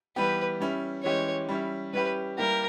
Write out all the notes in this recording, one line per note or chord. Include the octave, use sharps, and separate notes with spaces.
E3 G3 B3 G4 B4
G3 C#4 E4
E3 G#3 C#4 G4 C#5
G3 C#4 E4
G3 C#4 E4 G4 B4
G3 A#3 E4 G4 A#4